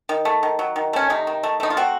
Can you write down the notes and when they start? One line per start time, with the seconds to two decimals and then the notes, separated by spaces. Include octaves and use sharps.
0.09 D#3
0.25 A3
0.43 D#3
0.59 F#3
0.76 D#3
0.93 A3 C#4
1.10 C3 D#4
1.27 D#3
1.43 A3
1.60 A3 D#4
1.70 F4
1.77 C4 F#4